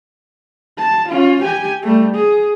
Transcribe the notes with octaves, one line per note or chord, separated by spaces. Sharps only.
A5
C#4 F4
G4 G#5
G3 A3
G#4